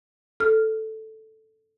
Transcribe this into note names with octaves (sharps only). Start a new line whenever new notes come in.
A4 F6